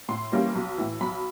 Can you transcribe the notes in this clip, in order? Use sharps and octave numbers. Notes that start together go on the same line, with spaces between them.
A2 C6
E3 G3 A#3 C#4
B1
A2 E3
B1 B5